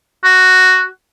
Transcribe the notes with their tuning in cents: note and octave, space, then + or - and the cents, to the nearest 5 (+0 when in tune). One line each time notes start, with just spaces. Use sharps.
F#4 +5